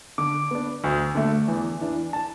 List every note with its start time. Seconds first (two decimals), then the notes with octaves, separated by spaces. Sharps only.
0.18 D3 D6
0.51 B3 D4
0.84 D2
1.15 D3 A3
1.48 E2
1.81 E3 D4
2.13 A5